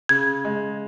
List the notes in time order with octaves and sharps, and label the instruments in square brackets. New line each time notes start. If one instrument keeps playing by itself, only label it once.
[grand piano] C#3 [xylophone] G#6
[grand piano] G#3